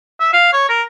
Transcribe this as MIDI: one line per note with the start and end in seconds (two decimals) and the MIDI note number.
0.20 0.31 76
0.33 0.49 77
0.53 0.68 73
0.69 0.82 70